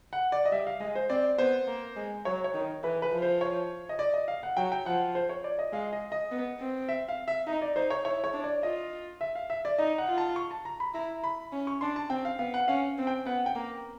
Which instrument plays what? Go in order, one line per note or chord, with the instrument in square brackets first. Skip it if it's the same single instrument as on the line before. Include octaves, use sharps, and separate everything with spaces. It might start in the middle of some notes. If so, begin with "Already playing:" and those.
[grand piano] F#5
D5
D#5
[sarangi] G3 [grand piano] E5
[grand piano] F5
[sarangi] G#3 [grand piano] D#5
[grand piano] C5
[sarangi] C4 [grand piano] D5
[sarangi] B3 [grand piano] C5
[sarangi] A#3
G#3
[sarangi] F#3 [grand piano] C#5
[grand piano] C#5
[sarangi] D#3
[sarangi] E3 [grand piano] B4
[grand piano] B4
[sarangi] F3
[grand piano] C5
C#5
D#5
D5
D#5
F5
F#5
[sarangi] F#3 [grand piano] G5
[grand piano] G5
[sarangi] F3 [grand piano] F#5
[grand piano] C5
C#5
D5
D#5
[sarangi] G#3 [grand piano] F5
[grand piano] D#5
D#5
[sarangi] B3
C4
[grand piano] E5
F5
E5
[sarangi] D#4 [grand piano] D#5
[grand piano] D5
[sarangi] D#4 [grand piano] C5
[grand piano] C#5
[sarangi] E4 [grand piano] C#5
[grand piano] C#5
[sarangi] D4
[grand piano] D5
[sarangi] F4 [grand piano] D#5
[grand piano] E5
F5
E5
D5
[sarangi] D#4 [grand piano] D#5
[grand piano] F#5
[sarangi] F4
[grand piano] A5
C#6
A5
A#5
B5
[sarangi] E4 [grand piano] A#5
[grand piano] B5
[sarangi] C#4
[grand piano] C#6
[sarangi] D4 [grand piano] C6
[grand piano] A5
[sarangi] C4 [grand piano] G5
[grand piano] F5
[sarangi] B3 [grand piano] F5
[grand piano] F#5
[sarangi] C#4 [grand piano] F5
[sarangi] C4
[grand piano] G5
[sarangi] B3 [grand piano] F#5
[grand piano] G5
[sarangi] A#3